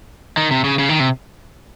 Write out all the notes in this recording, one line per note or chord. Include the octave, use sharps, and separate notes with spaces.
D#3
C3
C#3
C#3
D#3
C3